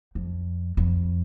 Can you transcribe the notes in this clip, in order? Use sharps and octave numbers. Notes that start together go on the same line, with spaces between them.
F2
F2